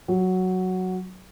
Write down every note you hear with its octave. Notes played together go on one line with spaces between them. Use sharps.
F#3